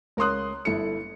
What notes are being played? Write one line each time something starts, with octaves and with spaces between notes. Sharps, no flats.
C#2 A#4 C#5 C6 D#6 F#6
G1 E4 A4 C#7